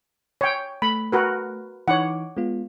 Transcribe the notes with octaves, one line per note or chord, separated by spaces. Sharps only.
C#5 G5
A3 B5
F#4 A#4 B4
E3 D#4 C#5 F#5 D6
G#3 B3 F4